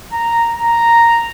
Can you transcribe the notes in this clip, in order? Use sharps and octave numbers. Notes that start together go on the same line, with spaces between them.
A#5
A#5